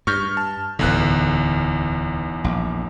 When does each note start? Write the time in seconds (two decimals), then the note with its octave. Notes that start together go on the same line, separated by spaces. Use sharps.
0.07 G2 C#6 F6 G6
0.37 A5
0.79 D1 B1 E2 D3 F#6
2.44 A#1